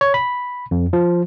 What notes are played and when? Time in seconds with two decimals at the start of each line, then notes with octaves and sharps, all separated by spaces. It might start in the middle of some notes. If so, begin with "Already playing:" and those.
0.01 C#5
0.14 B5
0.71 F2
0.93 F3